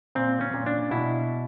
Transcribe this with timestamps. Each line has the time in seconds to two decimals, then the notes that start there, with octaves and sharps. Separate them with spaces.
0.15 A#2 C4
0.41 C#4
0.54 A#2
0.66 D4
0.91 B2 E4